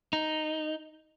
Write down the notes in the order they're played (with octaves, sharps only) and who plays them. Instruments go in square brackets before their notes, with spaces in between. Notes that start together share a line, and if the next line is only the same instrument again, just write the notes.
[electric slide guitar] D#4